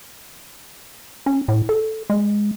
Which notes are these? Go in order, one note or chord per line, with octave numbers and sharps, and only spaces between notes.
C#4
A2
A4
G#3